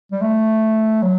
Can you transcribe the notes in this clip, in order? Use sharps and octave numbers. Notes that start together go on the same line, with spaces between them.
G3
A3
F#3